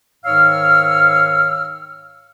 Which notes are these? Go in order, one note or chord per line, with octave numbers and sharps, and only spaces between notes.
G#2 D#3 C#5 F5 E6 F6